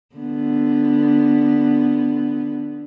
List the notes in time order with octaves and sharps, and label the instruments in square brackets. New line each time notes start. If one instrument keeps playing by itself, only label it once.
[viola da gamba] D3 B3